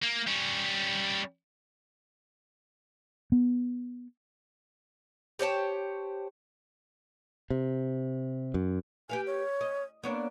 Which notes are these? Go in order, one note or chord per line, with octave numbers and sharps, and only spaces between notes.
A#3
G3 C#4
B3
G4 C5 C#5 A5
C3
F#2
G4 B4 F5 G#5
C#5
D#5
A#3 B3 C#4 D4